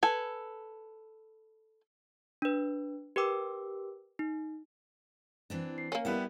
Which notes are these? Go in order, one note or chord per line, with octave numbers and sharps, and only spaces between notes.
A4 B4 G#5
D4 B4
G4 A#4 B4 G5 D6 E6
D#4
E3 C4 D4
C7
A#3 C#4 A#4
G3 B3 E4 G4 B4 E5